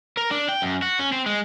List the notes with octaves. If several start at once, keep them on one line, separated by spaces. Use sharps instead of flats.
A#4
D4
G5
F#2
F#4
C#4
C4
G#3